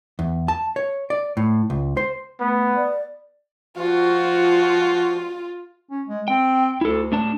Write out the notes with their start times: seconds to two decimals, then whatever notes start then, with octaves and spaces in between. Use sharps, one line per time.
0.19 E2
0.48 A5
0.76 C#5
1.10 D5
1.37 A2
1.70 C#2
1.97 C5
2.40 A3 B3
2.75 D5
3.77 F3 F4 F#4
5.91 C#4
6.07 G#3
6.28 C4 G5
6.81 D2 E4 A4
7.12 A2 D4 A5